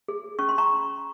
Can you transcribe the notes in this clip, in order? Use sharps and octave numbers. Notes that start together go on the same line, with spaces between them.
G#4
C#4 C#6
C6
A#5 C#6